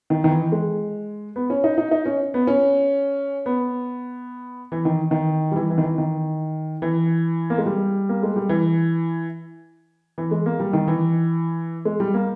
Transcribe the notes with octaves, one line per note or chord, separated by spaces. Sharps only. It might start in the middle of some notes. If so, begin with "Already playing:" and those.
D#3
D#3
E3
G#3
B3
C#4
D#4
D#4
D#4
C#4
B3
C#4
B3
E3
D#3
D#3
G3
E3
E3
D#3
E3
D#3
E3
A#3
G#3
G3
A#3
G#3
G3
E3
E3
G#3
A#3
G3
D#3
E3
G#3
G3
A#3